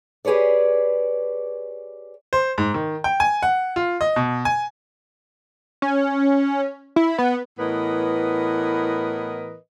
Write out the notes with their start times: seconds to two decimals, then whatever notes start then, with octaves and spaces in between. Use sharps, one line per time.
0.25 G4 G#4 B4 C#5 D5
2.33 C5
2.58 G#2
2.74 D#3
3.04 G5
3.20 G#5
3.43 F#5
3.76 F4
4.01 D#5
4.16 B2
4.45 G#5
5.82 C#4
6.96 E4
7.18 B3
7.59 A2 E3 B3 A#4 B4 D#5